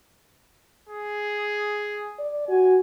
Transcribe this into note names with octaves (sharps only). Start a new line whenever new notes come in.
G#4
D5
F#4 G#5